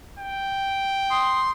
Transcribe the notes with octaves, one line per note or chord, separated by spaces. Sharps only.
G5
C6 D#6